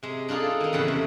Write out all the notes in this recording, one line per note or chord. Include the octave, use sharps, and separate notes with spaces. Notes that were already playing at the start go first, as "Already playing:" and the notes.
C3 G#3
D4 D#4 F4 G#4 A4
D#3 D#4
E2 A2 C#3 F#5 B5
C3